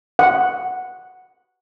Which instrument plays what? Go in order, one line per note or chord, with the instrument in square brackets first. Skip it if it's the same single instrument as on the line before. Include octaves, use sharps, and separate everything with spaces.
[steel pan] F#5